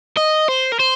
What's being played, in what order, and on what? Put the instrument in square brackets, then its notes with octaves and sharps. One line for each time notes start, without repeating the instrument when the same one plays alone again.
[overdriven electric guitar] D#5
C5
A#4
C5